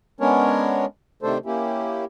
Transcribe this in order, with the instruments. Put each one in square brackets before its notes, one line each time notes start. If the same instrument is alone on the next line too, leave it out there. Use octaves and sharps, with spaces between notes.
[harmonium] G#3 B3 C#4 D4 A#4 C#5
C3 D#3 A3 D4 A4 C5
A#3 C#4 E4 G4